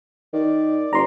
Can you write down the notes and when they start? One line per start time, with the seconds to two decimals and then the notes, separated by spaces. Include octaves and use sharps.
0.33 D#3 D5
0.93 F#1 A#5 C6